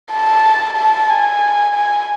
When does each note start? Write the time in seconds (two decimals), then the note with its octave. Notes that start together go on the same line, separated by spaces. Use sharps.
0.12 A5
0.77 A5
1.09 G#5
1.74 G#5